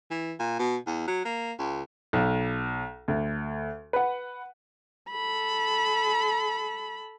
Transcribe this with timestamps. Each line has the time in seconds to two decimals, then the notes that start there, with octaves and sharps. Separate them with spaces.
0.11 E3
0.40 A#2
0.59 B2
0.87 E2
1.08 F#3
1.25 A#3
1.58 C#2
2.13 B1
3.08 D2
3.93 B4 F#5
5.12 A4 B5